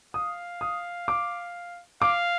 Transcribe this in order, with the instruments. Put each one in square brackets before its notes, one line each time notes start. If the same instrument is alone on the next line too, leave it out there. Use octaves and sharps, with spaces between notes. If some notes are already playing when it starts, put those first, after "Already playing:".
[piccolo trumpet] F5 [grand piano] D#6
[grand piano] D#6
D6
[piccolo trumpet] F5 [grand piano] D6